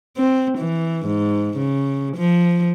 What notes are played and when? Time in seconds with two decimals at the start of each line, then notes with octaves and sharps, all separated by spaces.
0.17 C4
0.58 E3
1.06 G#2
1.57 C#3
2.16 F3